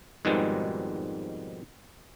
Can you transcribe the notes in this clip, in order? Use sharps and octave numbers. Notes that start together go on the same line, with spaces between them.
F2 G#2 B2 D#3 G3 G#3